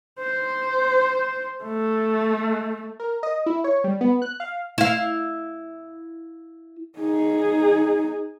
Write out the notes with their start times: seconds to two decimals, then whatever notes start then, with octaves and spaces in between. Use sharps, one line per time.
0.19 C5
1.63 A3
3.00 A#4
3.23 D#5
3.46 E4
3.64 C#5
3.84 G3
4.01 B3
4.22 F#6
4.40 F5
4.78 E4 F5
6.99 D#4 G#4